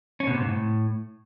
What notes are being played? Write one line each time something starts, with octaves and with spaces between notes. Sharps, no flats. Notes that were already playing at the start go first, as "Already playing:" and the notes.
C#4
B2
C3
G#2
A2